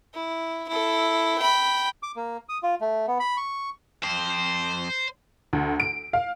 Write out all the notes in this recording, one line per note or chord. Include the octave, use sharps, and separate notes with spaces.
E4
E4 A4
G5 B5
D6
A#3
D#6
F4
A3
B3
B5
C#6
F2 C5
D2
D7
F5